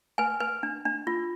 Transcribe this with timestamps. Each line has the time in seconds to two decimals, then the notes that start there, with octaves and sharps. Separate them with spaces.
0.18 B4 G#5
0.40 B4
0.63 D4
0.85 D4
1.07 F4